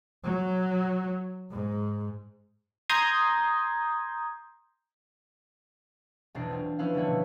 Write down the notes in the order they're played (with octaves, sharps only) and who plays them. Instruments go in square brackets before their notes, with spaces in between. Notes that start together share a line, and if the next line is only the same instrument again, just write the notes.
[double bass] F#3
G#2
[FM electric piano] A#5 C6 D#6 G6 G#6
[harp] E1 B1 D4 C7
C4 F4
F3 B3 C#4 E4 B4 F5
D3 G3 A3 B4 C#5
B2